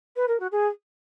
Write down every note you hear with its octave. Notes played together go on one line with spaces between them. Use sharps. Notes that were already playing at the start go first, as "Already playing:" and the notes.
B4
A#4
F#4
G#4